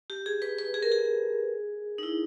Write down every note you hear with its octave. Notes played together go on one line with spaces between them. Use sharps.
G4
G#4
B4
B4
G#4
A#4
G#4
D#4
E4